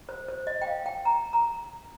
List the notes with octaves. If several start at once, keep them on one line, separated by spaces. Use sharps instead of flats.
C5
C5
D#5
G5
F5
G5
A#5
A#5